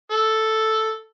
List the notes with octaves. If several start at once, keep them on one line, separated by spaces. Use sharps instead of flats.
A4